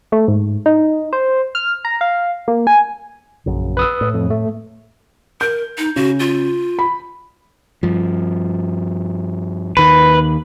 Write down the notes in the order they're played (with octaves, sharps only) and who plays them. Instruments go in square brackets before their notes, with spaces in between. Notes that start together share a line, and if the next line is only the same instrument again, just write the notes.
[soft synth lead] A3
G#2
D#4
C5
F6
A#5
F5
A#3
G#5
[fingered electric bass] A#1 F#2 C#3
[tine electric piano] B4 D#6 E6
[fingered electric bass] A2
[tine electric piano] F2
A3
[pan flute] A#4 [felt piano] G6
[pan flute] D#4
[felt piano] C#3 [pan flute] F#4
[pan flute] F4
[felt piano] B5
[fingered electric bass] G2 F3
[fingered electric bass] D#2 D#3 [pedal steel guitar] B4